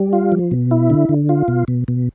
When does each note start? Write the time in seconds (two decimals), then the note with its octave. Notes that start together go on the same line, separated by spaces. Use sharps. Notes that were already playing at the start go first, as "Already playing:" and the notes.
Already playing: G3
0.13 F4
0.32 F3
0.51 B2
0.71 E4
0.90 D3
1.09 D3
1.29 F4
1.48 B2
1.68 B2
1.88 B2